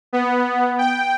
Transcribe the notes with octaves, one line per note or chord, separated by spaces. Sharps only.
B3
G5